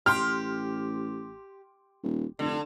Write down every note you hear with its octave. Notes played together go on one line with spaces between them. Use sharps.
A1 G4 C6 F6
D#1
F1 D3